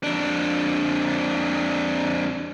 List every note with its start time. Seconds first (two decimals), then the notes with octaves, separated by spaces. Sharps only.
0.03 F2 D4